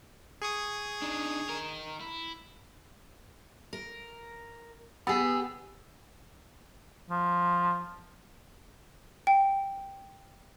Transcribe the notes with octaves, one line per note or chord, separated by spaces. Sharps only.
G#4 C#6 D#6
D4 D#4
D#4 A#4
E4
A#4
B3 G4 G#4 E6 A6
F3
G5